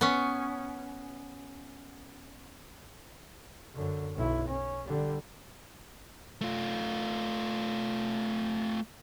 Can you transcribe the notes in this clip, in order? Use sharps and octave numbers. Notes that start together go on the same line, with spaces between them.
B3 C#4
F#2 D3
B1 E4
C#4
D3 G3
A3 F4